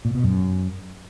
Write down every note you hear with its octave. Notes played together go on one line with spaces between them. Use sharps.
A#2
B2
F#2